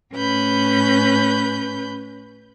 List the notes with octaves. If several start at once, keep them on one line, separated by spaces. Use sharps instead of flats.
A2 C#4 B4 B5 G6